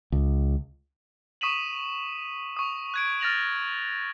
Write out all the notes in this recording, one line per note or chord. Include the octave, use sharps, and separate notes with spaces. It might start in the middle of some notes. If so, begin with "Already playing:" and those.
C#2
C#6 D#6 B6 D#7 E7 F#7
C#6 D#6
F#6 G#6 D7
F6 A6 A#6 F7 F#7